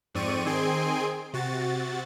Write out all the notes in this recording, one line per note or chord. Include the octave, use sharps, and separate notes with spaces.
F2 G#2 C4 D5 C#6 D#7
D#3 C4 G#4 G#5 C6 D7
C3 F#4 A6